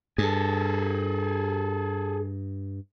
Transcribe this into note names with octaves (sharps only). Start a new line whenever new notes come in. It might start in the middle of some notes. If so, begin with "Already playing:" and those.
G2 G#4 A4